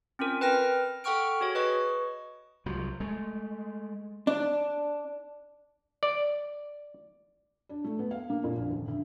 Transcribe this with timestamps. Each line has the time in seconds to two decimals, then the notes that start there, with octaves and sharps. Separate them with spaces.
0.19 C4 C#4 F4 A#4
0.41 B4 G5 F6 A#6
1.04 A4 F#5 G5 C#6 F6 D7
1.41 F#4 G#4 C#5
1.55 B4 D#5 C#6
2.66 C2 F3 F#3
3.00 G#3 A3
4.27 D4
6.03 D5
7.69 D4
7.84 A3
7.99 B3
8.11 F5
8.30 A#3
8.44 A#2
8.56 A#1
8.70 D#1
8.88 D2